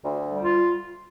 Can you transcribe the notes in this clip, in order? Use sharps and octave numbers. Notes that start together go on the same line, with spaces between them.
D2
G3
F4